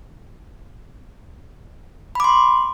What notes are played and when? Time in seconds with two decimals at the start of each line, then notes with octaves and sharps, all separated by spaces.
2.15 B5
2.20 D6
2.24 C6